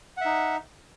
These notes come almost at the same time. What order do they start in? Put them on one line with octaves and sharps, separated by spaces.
F#5 E5 D#4